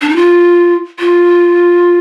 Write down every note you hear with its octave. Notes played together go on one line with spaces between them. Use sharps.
D4
D#4
F4
F4